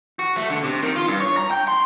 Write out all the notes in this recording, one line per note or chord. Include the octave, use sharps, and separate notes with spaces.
F#4
A3
D3
C3
D#3
F4
G2
C#5
A#5
G5
C6